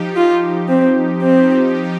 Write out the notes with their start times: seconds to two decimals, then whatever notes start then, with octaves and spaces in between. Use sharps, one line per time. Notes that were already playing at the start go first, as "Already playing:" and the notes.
Already playing: F3 D#4 G4
0.16 F4
0.68 C4
1.20 C4